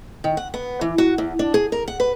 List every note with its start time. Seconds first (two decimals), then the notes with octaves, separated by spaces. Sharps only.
0.24 D#3
0.37 F#5
0.54 B3
0.81 E3
0.98 F#4
1.18 E2
1.39 D4
1.54 G#4
1.72 A#4
1.88 F#5
2.00 B4